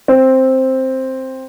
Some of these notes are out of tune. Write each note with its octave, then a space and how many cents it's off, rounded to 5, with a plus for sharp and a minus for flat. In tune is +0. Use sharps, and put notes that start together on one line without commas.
C4 +5